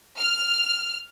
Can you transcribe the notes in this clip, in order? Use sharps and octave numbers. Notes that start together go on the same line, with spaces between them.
F6